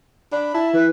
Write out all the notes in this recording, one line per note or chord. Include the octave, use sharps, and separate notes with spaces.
D4 B5
E4 A5
E3 B4